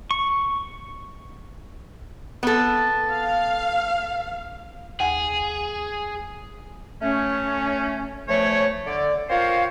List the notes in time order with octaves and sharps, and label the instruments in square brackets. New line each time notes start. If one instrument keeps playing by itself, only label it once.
[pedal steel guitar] C#6
[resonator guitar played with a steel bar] B3 A4
[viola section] F5
[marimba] D#2 F#5 G#5 [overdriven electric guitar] G#4
[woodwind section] A3 C#4
E2 F3 A3 C#5
D3 D5
C4 F4 A#4 C5 C#5 F5